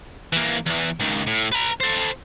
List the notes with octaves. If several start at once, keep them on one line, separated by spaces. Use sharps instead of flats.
E3 A#3
E2 E3
C#2 D#3
A2
B4 A#5
A4 C5